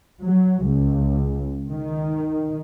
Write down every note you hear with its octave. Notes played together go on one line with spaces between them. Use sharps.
F#3
C#2
D#3